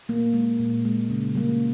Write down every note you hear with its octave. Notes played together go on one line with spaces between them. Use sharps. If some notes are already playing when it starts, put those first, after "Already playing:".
A#2 A#3
G#3
A#2
G#3
C#3
G3 A#3